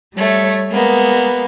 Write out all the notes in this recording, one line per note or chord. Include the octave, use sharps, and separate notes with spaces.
G3 A3 C#5
G#3 A#3 B3